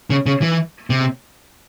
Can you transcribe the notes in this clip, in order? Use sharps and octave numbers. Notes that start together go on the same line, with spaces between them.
C#3
C#3
E3
C3